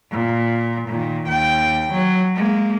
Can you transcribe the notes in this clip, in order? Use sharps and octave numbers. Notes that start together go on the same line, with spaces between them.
A#2
A#2 D#3
D#2 G5
F#3
G#3 A#3